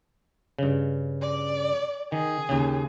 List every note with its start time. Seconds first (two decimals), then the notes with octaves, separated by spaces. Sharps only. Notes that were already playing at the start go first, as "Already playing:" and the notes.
0.59 G2 C#3
1.22 D5
2.12 D#3 G#4
2.49 D#2 C#3